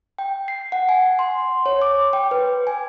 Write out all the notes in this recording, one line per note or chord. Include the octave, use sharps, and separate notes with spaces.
G5
C7
F#5
G#5
C6
C#5
D6
G5
B4
G#5